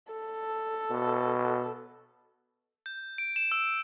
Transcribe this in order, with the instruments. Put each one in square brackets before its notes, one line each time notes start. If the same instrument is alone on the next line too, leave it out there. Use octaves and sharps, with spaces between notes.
[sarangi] A4
[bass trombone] B2
[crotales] G6
D7
E7
E6